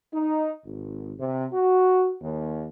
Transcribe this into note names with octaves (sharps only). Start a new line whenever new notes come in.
D#4
G#1
C3
F#4
D#2